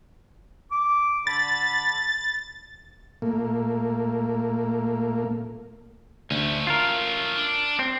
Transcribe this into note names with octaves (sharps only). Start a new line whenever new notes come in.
D6
D3 B5 A6
A#2 A3 A#3
D2 A3 C#4
F4 A#4
D4
C4